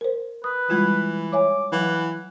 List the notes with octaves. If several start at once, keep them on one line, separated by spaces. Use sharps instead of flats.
A#4 C5
B4 D#6
E3 G3 G#3 F4
C#5 E5 G#5 D6
E3 F#3 F#5